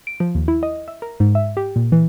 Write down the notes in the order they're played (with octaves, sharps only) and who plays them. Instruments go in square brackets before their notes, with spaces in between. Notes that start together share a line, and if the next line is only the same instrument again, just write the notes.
[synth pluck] D7
F3
D#2
E4
D#5
E5
A#4
G#2
E5
G4
A#2
E3